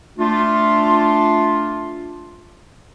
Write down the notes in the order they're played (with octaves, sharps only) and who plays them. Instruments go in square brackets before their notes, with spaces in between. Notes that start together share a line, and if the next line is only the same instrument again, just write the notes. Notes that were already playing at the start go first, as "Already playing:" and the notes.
[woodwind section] A3 D4 F4